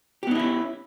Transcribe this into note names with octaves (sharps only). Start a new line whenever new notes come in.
B3 C#4 D#4 E4 G4